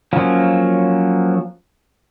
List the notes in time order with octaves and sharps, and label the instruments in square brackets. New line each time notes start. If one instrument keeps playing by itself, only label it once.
[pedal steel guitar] F3 F#3 A#3 C#4